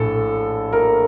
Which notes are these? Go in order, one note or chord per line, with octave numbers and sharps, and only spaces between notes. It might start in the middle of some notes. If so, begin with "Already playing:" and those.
Already playing: A#1 A2 A4
A#4